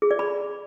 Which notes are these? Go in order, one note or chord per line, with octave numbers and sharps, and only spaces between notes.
G#4
D5
B5